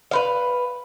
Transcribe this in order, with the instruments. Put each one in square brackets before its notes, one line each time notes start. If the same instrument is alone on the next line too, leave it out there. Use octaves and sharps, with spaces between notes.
[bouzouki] B4 C5 F5